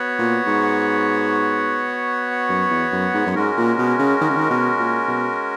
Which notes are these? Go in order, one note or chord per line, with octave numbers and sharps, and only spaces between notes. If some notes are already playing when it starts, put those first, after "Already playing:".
Already playing: B3 F#4 C#5 F#5
A#2
G#2
F#2
E2
F#2
G#2
F#2
G#2 G#3 C#4 F#4 A#4
A#2
B2
C#3
D#3
C#3
D#3
B2
A#2
B2